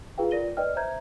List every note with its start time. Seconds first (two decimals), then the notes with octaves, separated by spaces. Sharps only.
0.18 F4 G#4 B4 F5 G5
0.31 F4 A#4 D5 A#6 D#7 G7
0.57 B4 D5 D#5 G5 F6
0.76 C5 E5 A#5 G6 G#6